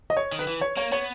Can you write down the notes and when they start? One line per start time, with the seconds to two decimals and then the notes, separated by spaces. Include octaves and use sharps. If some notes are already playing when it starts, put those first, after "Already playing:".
0.10 D#5
0.17 C#5
0.32 D#3
0.39 B4
0.47 E3
0.61 C#5
0.77 A#3 C#5
0.92 B3 C#5